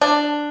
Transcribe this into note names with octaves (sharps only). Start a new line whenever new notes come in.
D4